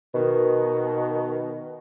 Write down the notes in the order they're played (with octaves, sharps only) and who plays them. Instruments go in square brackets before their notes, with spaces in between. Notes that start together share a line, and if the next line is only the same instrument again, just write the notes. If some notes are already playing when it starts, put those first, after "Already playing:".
[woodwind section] B2 D#3